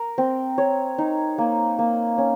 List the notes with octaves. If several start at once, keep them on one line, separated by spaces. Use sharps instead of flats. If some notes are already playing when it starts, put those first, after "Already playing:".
Already playing: A#4
C4
C#5
D#4
A#3
A#3
C#4